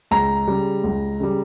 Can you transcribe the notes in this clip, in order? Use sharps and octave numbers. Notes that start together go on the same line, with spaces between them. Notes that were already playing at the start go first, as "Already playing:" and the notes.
C#2 A#5
C#3 G3
C#2
C#3 G3